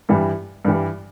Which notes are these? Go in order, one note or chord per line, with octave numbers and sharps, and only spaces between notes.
G2 E3 G3
G2 E3 G3